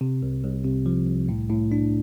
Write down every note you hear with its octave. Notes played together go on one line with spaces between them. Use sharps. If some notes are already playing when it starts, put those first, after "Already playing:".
C3
C2
C2
C3
F3
C2
A2
A2
D4